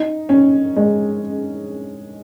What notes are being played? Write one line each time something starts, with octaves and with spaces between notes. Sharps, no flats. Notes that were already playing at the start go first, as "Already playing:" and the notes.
Already playing: D#4
C#4
G#3